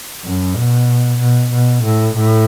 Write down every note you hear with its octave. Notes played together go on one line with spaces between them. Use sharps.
F#2
B2
B2
B2
A2
A2